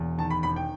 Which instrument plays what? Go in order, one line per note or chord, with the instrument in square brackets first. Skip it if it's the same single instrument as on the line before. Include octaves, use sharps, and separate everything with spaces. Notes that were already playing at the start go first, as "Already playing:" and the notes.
Already playing: [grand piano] E1 E2
D#3 A5
B5
E1 B5
G5